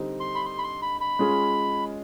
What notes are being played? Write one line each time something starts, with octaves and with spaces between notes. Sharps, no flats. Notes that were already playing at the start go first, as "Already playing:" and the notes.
Already playing: D3 G3 C4 D#4
C6
B5
C6
B5
C6
B5
B5
G#3 C#4 F4 G#4